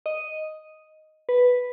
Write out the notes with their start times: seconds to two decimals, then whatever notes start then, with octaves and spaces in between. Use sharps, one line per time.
0.06 D#5
1.29 B4